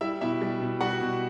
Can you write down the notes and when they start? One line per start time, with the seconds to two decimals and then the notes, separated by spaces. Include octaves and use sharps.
0.01 G3 E4 E5
0.21 B2 E4 E5
0.42 G3
0.61 B2
0.81 G3 F#4 F#5
1.01 B2